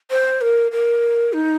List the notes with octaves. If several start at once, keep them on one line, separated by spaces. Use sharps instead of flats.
C5
A#4
A#4
D#4